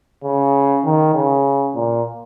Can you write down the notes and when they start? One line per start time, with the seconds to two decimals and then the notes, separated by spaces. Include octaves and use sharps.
0.24 C#3
0.84 D#3
1.15 C#3
1.75 A#2